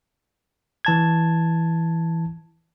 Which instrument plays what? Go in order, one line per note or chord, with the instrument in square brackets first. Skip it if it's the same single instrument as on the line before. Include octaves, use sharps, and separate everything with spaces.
[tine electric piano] E3 A5 G#6